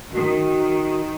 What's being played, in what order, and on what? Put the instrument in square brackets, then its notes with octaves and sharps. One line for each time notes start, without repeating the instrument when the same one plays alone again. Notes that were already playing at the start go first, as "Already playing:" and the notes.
[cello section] D#3 [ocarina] F#4